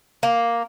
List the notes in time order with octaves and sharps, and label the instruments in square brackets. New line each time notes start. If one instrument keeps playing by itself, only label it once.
[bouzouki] A#3